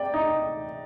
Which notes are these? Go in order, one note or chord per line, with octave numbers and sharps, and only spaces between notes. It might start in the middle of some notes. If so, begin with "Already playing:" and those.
Already playing: D5 G5
D#4